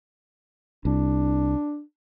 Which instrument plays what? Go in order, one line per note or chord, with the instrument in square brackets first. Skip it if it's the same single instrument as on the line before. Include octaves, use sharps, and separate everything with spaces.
[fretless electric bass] C2 [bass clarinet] D4